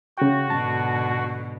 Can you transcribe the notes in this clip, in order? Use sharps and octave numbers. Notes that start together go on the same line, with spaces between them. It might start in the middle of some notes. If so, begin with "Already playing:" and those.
C#3 F#4 G5
G#2 B2 D3 A5